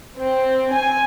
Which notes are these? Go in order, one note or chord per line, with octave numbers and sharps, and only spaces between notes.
C4
G#5